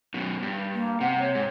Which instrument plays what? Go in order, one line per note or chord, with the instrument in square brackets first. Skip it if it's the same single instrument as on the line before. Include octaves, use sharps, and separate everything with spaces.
[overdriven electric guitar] F#2 B2
G2
[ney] A#3
[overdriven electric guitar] C3 [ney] F#5
[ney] C#5
[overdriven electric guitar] G#2